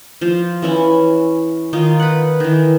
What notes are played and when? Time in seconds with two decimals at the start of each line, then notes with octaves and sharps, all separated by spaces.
0.21 F3 F4
0.62 E3 C#4 E4
1.73 D#3 D#4 F4
2.00 B4 F#5
2.40 D#3 E3